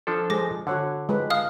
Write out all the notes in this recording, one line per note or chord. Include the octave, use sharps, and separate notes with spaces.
F3 D4 A4
G#3 G#4 C5 D6 A#6
D3 F#4 C#5 F#5
G#3 F4 B4
F5 D#6 F6